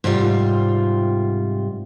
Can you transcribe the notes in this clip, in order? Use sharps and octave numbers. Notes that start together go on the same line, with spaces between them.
G#2 C3 G3 F4